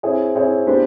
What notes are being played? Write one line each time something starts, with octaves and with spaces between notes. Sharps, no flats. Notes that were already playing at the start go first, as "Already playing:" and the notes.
C4 E4 G#4 C#5
C4 E4 G#4 C#5
B3 D4 G4 C5